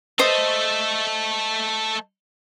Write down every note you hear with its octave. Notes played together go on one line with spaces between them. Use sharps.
A3 A4 C5 D#5 D#6